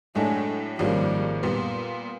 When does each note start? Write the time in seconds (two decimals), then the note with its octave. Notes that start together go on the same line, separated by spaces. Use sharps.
0.15 A2 F#3 G#3 A3 D4 F#4
0.79 G#1 G#2 F3 G3 A#3 C#4
1.43 A#2 G3 B3